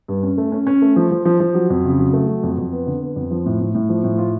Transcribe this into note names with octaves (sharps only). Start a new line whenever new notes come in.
G2
C#4
A3
C#4
C#4
A3
F3
F3
F3
F3
F#3
F2
C#3
F#3
A3
F#3
F2
F2
B3
D3
B3
F2
F3
A2
A2
A2
F3
A2
F4